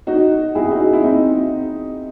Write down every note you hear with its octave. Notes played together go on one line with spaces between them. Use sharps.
D#4 F#4
E4 G#4
D#4 F#4
E4
C4 D#4